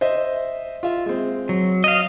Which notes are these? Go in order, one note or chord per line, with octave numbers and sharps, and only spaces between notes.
C5 D#5 E5
F4 E5
G#3 C4
F#3
D#5 F5